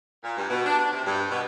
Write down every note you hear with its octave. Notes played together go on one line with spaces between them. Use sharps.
A#2
G2
B2
D4
D4
C3
G2
B2